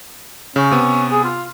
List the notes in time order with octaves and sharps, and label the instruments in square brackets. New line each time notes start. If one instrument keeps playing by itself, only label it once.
[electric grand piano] C#3 [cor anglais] C#4
[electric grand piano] C3 B3
[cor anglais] G#4
F4